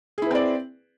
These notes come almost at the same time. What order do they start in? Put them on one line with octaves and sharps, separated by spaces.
G#4 E4 B4 C4 D5